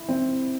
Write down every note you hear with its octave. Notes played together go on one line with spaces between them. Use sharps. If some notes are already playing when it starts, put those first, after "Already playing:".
Already playing: E4
C4